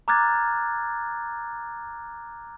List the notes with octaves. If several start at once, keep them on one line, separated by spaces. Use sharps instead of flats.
A#5 D6 F6 F#6 G#6 A6